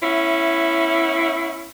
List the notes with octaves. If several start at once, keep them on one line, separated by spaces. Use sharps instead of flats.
B3 C#4 E4 E5